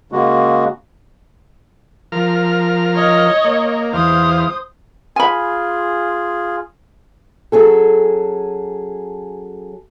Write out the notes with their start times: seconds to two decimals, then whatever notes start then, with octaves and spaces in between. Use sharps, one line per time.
0.12 C#3 G#3 A#3 F#4
2.12 F3 A#4 F6
2.96 C#5 D#5
3.45 A#3
3.93 E2 C5 F5 D#6
5.16 F4 G#4 G#5 B5
7.52 F#3 C#4 G#4 A4